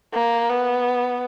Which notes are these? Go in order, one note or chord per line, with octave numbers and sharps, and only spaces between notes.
A#3
B3